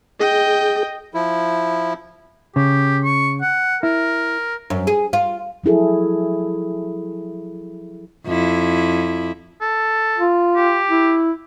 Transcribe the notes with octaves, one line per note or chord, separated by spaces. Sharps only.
G#4 D#5 G5
F3 E4
C#3 G4
C#6
F#5
E4 A#4
F#2
G#4
F4
F3 F#3 E4 G#4 A4
F2 E4
A4
F4
G4
E4